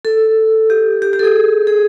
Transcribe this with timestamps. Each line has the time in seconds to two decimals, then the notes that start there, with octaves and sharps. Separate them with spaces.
0.05 A4
0.70 G4
1.02 G4
1.13 G4
1.19 A4
1.24 G#4
1.67 G#4